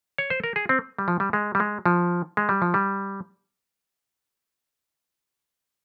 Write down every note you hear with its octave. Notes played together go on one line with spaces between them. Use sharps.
C#5
C5
A#4
G#4
C4
G3
F3
G3
G#3
G3
G#3
F3
G#3
G3
F3
G3